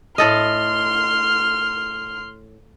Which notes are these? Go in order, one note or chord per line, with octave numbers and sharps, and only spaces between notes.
A2 A4 D#5 C6 F6